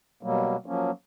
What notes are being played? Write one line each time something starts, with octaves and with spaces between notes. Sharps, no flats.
B2 F#3 G3 A#3
F3 F#3 A#3 C#4